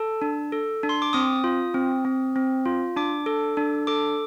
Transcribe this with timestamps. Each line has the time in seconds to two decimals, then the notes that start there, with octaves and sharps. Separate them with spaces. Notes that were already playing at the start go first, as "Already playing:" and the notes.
Already playing: A4 A5
0.22 D4
0.52 A4
0.83 D4
0.89 C6
1.02 D6
1.13 C4 D#6
1.44 F4
1.74 C4
2.05 C4
2.36 C4
2.65 F4
2.96 D4 D6
3.26 A4
3.57 D4
3.87 A4 D6